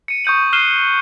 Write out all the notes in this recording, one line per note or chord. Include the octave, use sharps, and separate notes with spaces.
C#7 D#7
C#6 D#6 G6 D#7 F#7
F6 F#6 C7 D#7 E7 G7